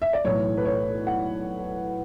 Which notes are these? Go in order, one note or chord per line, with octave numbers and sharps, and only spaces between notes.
E5
D5
B1 A2 E3 A3 C#5
B4
C#5
F#5